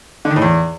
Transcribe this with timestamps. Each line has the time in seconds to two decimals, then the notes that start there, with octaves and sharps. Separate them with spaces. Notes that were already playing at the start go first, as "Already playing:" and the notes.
0.25 D3
0.31 D#3
0.36 A2
0.42 E2